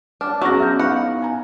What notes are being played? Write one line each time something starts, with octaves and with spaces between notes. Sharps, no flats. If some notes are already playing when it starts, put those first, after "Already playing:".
D4 C#5 D6 F6
F#3 B3 C#4 F#4 G#4 A#6
E5 F6 G6
B3 D#4 F5 F#5 B5
G#5 A#5